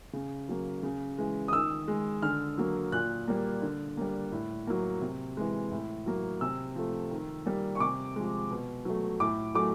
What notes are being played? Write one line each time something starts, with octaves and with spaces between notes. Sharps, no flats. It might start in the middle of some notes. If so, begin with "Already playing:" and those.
C#3
F#3 A#3
C#3
E3 G#3
D#6
D#3 E6
G#3
D3 F6
F#3 A#3
A#2 F#6
G3 A#3
D3
G3 A#3
A2
F#3 A#3
C3
E3 G#3
A2
F#3 A#3
C3 E6
F3 A3
D#3
G3 A#3
C#6
C3 D6
F3 G#3
B2
F#3 A3
A2 D6
F#3 A3 D6